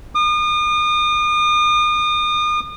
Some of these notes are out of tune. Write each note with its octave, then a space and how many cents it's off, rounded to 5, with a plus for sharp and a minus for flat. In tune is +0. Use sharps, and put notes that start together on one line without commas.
D#6 -40